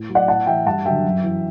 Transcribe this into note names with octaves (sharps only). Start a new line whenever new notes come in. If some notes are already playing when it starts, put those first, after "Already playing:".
Already playing: A2
F#3
D5 F#5
A2 F#5 A5
E3 E5 G5
G2 F#5 A5
D3 F#3 E5 G5
F#2
E3